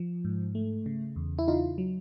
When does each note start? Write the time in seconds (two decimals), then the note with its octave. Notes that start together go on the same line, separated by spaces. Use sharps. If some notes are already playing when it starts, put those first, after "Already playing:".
Already playing: F3
0.25 G#2
0.55 A3
0.86 C#3
1.16 E2
1.39 E4
1.48 C#3 D#4 F4
1.78 F#3